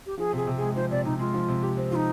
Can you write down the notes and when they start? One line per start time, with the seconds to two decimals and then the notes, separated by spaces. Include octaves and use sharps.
0.06 G4
0.18 F3 G#4
0.33 C3 G#4
0.47 C3
0.57 G#3 G#4
0.76 F3 C5
0.91 C3 D5
1.05 C3 D#4
1.19 G#3 F4
1.34 F3
1.48 C3
1.62 G4
1.77 C4
1.91 F3 F4
1.96 D#4